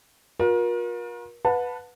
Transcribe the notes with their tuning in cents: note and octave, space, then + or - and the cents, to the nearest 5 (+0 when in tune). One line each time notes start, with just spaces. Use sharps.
F4 +45 A#4 +35
B4 +0 F#5 -35 A5 +15